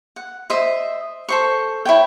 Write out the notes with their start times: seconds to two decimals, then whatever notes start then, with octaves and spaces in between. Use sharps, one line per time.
0.16 F#5
0.50 C5 D#5 E5
1.28 A4 C5 C#6
1.85 E4 C#5 G5